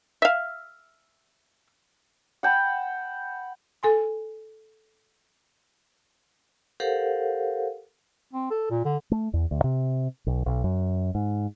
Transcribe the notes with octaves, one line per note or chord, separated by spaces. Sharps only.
E5 F5
F#5 G5 A5 B5
A4 G#5 C6
G4 A4 A#4 C5 F5 F#5
C4
A4
A#2
D3
A3
E2
D2
C3
B1
B1
F#2
G#2